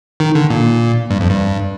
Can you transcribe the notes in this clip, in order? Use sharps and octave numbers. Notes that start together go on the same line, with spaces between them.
D#3
D3
A#2
G2
F2
G2